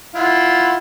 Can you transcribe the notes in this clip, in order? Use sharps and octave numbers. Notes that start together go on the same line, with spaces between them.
E4 F4 F#5